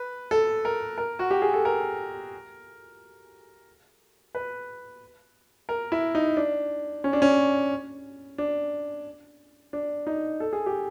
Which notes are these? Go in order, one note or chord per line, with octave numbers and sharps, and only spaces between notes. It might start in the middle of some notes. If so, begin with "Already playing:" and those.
Already playing: B4
A4
A#4
A#4
F#4
G4
G#4
A4
A#4
B4
A#4
E4
D#4
D4
C#4
D4
C#4
D4
D4
D#4
A4
G#4
G4